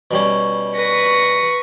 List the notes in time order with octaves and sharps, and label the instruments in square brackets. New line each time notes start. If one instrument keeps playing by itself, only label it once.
[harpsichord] B2 G3 C#4
[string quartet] B4 C#6 A#6